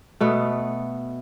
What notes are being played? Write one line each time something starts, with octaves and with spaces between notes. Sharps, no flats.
B2 A3 B3